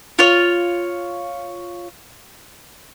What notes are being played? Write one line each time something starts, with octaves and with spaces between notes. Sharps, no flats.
F4 C#5